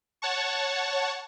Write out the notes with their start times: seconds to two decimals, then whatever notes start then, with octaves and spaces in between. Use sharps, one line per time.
0.22 C#5 F#5 A5 C#6